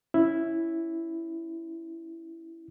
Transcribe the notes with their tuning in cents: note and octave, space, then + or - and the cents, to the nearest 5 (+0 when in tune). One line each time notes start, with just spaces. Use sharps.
C#4 +5 E4 +0